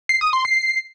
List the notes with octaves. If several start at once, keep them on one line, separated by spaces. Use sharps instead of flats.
C7
D#6
C6
C7